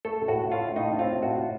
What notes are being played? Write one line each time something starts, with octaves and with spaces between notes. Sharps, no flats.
A3 A4
A2 F#4
A3 F4
A2 D#4
C4 F4
A2 F#4